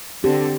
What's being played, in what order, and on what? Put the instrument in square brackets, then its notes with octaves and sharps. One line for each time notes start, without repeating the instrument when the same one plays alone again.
[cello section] D3 C4 A4 [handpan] G4